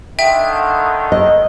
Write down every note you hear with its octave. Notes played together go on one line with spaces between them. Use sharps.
D3 D#3 E5 G5
D#5